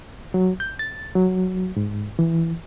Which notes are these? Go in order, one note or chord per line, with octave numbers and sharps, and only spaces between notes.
F#3
G6
A6
F#3
G#2
E3